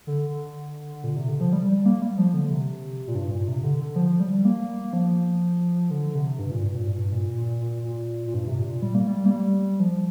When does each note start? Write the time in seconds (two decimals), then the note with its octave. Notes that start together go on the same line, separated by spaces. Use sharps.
0.07 D3
1.04 A#2
1.16 C3
1.29 D3
1.40 F3
1.53 G3
1.69 G3
1.86 A#3
2.02 G3
2.18 F3
2.34 D3
2.50 C3
3.07 A#2
3.15 G2
3.31 A#2
3.48 C3
3.64 D3
3.80 D3
3.96 F3
4.20 G3
4.45 A#3
4.93 F3
5.91 D3
6.15 C3
6.39 G2
6.51 A#2
6.63 G2
6.76 A#2
6.87 G2
7.12 A#2
7.37 A#2
7.61 A#2
7.84 A#2
8.27 A#2
8.34 G2
8.47 C3
8.58 A#2
8.82 G3
8.94 A#3
9.07 G3
9.19 G3
9.25 A#3
9.31 G3
9.80 F3